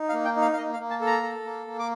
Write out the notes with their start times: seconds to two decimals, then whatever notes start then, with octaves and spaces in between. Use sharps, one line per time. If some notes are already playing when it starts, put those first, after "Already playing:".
Already playing: D#4
0.09 F5
0.13 A#3
0.25 G5
0.36 D#4
0.42 F5
0.53 F5
0.57 A#3 D#5
0.73 F5
0.79 A#3
0.90 A5
1.00 A4
1.07 A#5
1.23 A4
1.45 A#3
1.67 A#3
1.79 D6